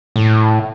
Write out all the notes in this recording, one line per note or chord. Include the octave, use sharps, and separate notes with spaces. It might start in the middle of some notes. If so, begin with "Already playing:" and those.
A2